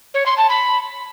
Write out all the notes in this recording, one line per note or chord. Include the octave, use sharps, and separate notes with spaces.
C#5
C6
A5
B5